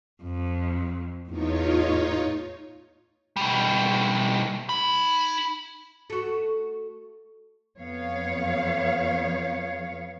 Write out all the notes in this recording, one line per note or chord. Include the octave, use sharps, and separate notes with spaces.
F2
E2 A2 D#4 F4 C#5
B2 G3
D#4 B5
A3 F#4
F2 B3 C#5 F5